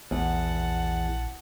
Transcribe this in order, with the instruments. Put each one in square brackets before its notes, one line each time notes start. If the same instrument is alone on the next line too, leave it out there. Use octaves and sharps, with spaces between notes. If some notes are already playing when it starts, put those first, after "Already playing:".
[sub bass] A#1 [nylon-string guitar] E2 [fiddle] F#5 A5